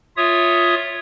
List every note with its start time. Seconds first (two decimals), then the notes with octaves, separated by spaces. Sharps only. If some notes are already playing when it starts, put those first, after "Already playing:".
0.17 F4 C#5 E5 D#6